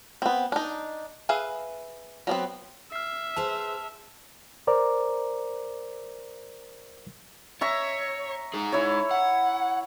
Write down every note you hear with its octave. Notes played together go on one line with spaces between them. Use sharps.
B3 C4
D4 D#4
G#4 B4 E5 F5
F#3 B3 C4
E5 F6 C7
G#4 B4 C5 A5 F7
A#4 C5 D5 A#5 D6
C#5 E5 A#5 C#6
D#4 G#4
E4 C#5
F#5